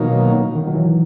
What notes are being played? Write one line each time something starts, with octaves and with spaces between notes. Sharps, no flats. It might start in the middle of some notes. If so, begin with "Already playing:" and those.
Already playing: B2 D#3 F#3 A#3 D#4
D#3
F#3
E3